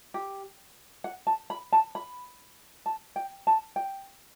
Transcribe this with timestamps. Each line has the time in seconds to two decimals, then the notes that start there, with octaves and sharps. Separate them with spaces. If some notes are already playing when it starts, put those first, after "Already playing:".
0.14 G4
1.04 F#5
1.27 A5
1.50 B5
1.72 A5
1.95 B5
2.86 A5
3.16 G5
3.47 A5
3.76 G5